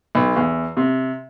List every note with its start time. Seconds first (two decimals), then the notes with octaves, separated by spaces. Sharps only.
0.15 B1
0.36 E2
0.77 C3